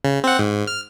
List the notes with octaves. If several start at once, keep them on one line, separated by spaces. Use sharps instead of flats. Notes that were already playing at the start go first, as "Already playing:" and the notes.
C#3
C4 F#5
G#2
F6